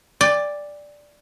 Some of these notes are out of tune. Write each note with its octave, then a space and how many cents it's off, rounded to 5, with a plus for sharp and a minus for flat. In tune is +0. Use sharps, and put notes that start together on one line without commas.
D5 +0 G5 +40